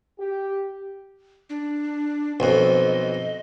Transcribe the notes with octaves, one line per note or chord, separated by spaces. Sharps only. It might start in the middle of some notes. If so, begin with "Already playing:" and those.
G4
D4
B1 F2 D#5